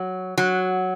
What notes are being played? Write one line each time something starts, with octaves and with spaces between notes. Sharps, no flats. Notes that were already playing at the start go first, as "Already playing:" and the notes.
Already playing: F#3
F#3